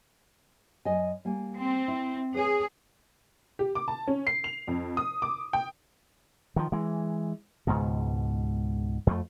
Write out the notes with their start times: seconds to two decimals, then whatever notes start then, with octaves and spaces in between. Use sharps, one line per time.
0.85 F#2 D#5 G#5
1.25 G3 A#3 G#5
1.56 C4
1.88 E4
2.34 G#4 B4 C#5
3.59 G4
3.75 D6
3.88 A5
4.07 C#4
4.27 C7
4.44 F7
4.68 F2
4.97 D#6
5.22 D6
5.53 G5
6.56 D#3 F3
6.72 E3 G#3
7.67 C#2 G#2 B2
9.07 F2 A3